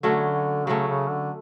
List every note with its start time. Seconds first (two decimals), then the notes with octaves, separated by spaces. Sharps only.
0.03 D3 F#3 A3 C#4
0.67 C#3 F#3 A3 C#4
0.88 C#3
1.09 D3